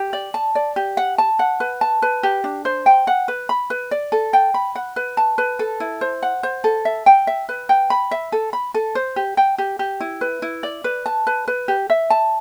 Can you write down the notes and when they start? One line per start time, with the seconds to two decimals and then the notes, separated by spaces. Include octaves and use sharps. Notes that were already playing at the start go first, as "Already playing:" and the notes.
Already playing: G4
0.13 D5
0.34 A5
0.55 D5
0.76 G4
0.97 F#5
1.18 A5
1.39 F#5
1.60 B4
1.81 A5
2.02 B4
2.23 G4
2.44 D4
2.65 C5
2.86 G5
3.07 F#5
3.28 B4
3.49 B5
3.70 B4
3.91 D5
4.12 A4
4.33 G5
4.54 B5
4.76 F#5
4.96 B4
5.17 A5
5.38 B4
5.59 A4
5.80 E4
6.01 C5
6.23 F#5
6.43 C5
6.64 A4
6.85 E5
7.06 G5
7.27 E5
7.49 B4
7.69 G5
7.90 B5
8.11 E5
8.32 A4
8.53 B5
8.74 A4
8.95 C5
9.16 G4
9.37 G5
9.58 G4
9.79 G4
10.00 E4
10.21 B4
10.42 E4
10.63 D5
10.84 B4
11.06 A5
11.27 B4
11.48 B4
11.68 G4
11.90 E5
12.10 A5